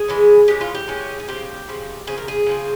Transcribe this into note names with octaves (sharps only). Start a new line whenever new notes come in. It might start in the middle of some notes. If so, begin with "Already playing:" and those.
Already playing: G#4
E3 G#3 C#4
E3 G#3 C#4 G4
F4
G4
E3 G#3 C#4
G#4
C#3 F3 C4 G4
C#3 F3 C4
C#3 F3 C4 G#4
A#4
G#4
C#3 F3 C4